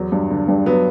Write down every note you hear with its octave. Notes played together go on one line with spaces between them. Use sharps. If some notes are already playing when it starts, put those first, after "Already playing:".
Already playing: E2 F#3
G2
D3
G2
F#3 B3